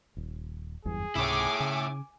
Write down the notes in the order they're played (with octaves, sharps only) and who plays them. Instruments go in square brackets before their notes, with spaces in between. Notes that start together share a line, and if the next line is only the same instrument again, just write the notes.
[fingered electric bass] D#1
[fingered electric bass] F#1 E2 G2 [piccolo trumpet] G#4
[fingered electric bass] C#2 G#2 C3 [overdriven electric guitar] E4 C#5 [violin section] G#5 D6
[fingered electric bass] C#3